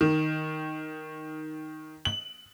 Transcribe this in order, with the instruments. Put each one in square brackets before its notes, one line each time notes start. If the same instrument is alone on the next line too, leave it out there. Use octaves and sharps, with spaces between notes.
[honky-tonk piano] D#3
F#7